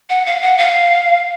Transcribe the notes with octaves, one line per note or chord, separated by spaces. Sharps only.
F#5
F5
F#5
F5